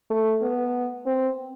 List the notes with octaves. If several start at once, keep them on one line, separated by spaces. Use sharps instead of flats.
A3
B3
C4